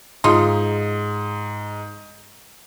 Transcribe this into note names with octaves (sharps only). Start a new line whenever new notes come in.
G#2 D#4 F4